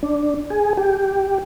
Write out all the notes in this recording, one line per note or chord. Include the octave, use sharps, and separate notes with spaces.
D4
G#4
G4